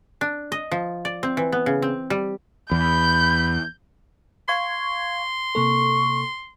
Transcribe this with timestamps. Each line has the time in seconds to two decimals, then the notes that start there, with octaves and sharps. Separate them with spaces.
0.21 D4
0.52 D#5
0.71 F3
1.05 D5
1.23 C4
1.37 E3
1.52 B3
1.66 C#3
1.82 C4
2.10 G3
2.71 E2 B5 G6
4.49 F5 C6 C#6 G#6
5.55 C3 A#3 A4 C#6